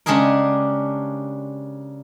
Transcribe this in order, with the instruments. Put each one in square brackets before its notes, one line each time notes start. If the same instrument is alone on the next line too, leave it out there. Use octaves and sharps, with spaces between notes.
[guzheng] C#3 G#3 D4 G4 G#4 A#4